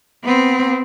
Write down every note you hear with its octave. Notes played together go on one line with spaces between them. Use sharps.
B3 C4